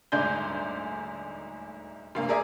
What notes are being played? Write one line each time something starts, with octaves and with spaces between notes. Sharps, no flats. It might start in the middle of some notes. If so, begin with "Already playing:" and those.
D#1 D2 G#2 D5 G#5 G6
F1 G2 A#3 F5
G#4 A#4 D5 E5 G#5 A#5